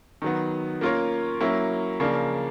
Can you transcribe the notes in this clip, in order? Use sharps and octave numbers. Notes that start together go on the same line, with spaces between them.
D#3 F#3 B3
A#3 C#4 F4 A#4 C#5
F#3 A#3 C#4 E4
C#3 F3 A#3 D4